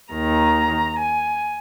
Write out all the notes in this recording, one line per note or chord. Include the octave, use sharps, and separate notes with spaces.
D#2 D#3 A#5
G#5